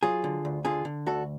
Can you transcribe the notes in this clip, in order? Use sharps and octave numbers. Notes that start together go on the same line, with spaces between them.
F#3 F4 G#4
D3
D2
D3 F4 G#4
D3
D2 F#4 A4